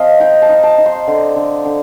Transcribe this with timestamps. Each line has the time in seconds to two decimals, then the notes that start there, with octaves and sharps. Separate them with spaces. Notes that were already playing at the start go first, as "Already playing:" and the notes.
Already playing: F3 C4 D#5 F5
0.20 D#4 G5
0.42 A5
0.49 D#4
0.63 A5
0.78 D#4
0.86 C6
1.07 D3
1.36 D3
1.65 D3